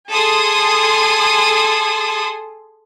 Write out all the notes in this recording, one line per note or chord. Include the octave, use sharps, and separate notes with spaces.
G#4 A4 C6 D#6